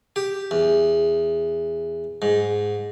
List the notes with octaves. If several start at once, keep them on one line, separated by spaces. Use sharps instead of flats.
G4
E2
G#2